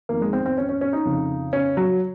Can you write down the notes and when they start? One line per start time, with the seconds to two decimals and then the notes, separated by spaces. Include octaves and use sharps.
0.09 F2 D#3 A#3
0.22 G#3
0.33 C4
0.46 C4
0.58 C#4
0.69 C#4
0.81 C#4
0.93 D#4
1.05 F2 C#3
1.53 C#4
1.77 F#3